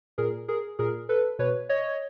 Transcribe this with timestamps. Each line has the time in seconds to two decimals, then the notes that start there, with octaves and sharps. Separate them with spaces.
0.18 A#2 G#4 A#4
0.48 G#4 A#4
0.79 A#2 G#4 A#4
1.09 A4 B4
1.39 B2 B4 C#5
1.69 C#5 D#5